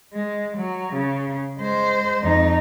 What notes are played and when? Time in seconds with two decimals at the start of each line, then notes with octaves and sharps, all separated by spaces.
0.14 G#3
0.57 F#3
0.93 C#3
1.59 G#3 C5
2.22 F2 D#4